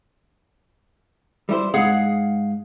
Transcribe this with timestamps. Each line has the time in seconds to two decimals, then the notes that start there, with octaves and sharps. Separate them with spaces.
1.49 G3 E4 C5
1.74 G#2 G#4 F5 F#5